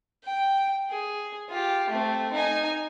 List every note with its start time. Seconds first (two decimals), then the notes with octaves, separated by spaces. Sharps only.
0.24 G5
0.90 G#4
1.50 F4 G4
1.89 A3 C4
2.33 D#4 G#5